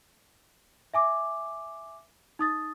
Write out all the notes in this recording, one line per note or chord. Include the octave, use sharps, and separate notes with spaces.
E5 G#5 D6
D#4 D#6 A6